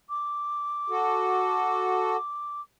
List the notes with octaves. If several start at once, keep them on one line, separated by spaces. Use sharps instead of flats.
D6
F#4 A4